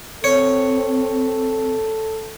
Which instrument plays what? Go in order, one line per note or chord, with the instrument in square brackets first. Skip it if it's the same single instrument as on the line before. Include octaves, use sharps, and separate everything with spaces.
[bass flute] C4 [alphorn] A4 [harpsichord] C#5